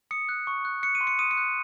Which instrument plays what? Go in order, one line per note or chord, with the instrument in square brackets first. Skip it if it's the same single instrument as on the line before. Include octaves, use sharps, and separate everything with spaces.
[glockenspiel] D#6 C#7
F#6
C#6
F#6
F#6 C#7
D#7
C6
C#7
D#6 D#7
C#7
F#6